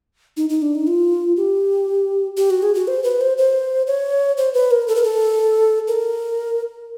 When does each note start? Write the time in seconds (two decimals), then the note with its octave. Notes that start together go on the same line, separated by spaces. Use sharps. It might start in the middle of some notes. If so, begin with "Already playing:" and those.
0.37 D#4
0.49 D#4
0.62 D4
0.75 D#4
0.87 F4
1.37 G4
2.37 G4
2.50 F#4
2.62 G#4
2.75 F#4
2.87 C5
3.04 B4
3.21 C5
3.38 C5
3.87 C#5
4.37 C5
4.54 B4
4.71 A#4
4.88 A4
4.96 A#4
5.04 A4
5.88 A#4